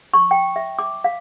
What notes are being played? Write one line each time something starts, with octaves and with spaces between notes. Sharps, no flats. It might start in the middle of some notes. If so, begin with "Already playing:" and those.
C#6
G5
E5
D6
F5